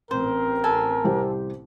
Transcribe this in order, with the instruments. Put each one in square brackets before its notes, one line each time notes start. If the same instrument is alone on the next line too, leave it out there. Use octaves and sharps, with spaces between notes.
[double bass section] A1 C4 [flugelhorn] A#4 [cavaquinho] C5
[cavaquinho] A4 G#5
[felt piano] C2 G4 C5